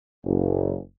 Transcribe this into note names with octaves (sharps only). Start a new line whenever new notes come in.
F#1